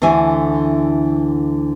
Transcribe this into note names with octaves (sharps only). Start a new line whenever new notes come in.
D2 D3 E3 E4 G#5